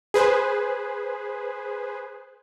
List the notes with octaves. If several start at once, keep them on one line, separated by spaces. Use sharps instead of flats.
G#4 B4 C5